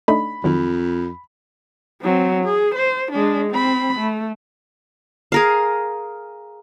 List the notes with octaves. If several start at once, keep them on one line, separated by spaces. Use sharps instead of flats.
A3 D4 D#4 B5
F2 D#3 F#3
F#3 C4
G#4
C5
G#3 D4
C4 B5
A3
G#4 A#4 F5